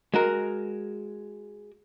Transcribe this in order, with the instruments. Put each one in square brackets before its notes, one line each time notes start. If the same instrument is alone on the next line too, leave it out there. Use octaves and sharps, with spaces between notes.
[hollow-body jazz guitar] G#3 F#4 A#4